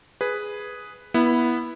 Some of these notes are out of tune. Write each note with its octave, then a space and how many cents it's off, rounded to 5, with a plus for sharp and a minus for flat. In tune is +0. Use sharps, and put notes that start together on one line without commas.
G#4 +0 B4 +0
B3 -20 E4 +0